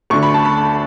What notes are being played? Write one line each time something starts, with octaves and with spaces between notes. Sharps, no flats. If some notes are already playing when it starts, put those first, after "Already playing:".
D2 D3 C#6
B5
A5
B5